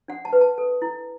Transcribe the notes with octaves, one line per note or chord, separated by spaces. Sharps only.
D4 F#5
A5
B4
A5
A4
E4